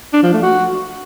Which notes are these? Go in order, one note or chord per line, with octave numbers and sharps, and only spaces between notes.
D4
F3
A3
F#4